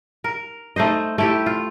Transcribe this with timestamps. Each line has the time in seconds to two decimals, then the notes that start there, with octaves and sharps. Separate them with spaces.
0.24 A#4
0.76 A3 D#4 C5 D#5
1.18 A3 E4 G4
1.46 F4